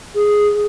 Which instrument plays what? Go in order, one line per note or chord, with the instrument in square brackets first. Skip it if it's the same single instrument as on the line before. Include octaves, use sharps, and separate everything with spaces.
[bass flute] G#4